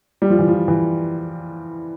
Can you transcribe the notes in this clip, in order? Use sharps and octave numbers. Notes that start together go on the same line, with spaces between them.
G3
F3
E3
F3
E3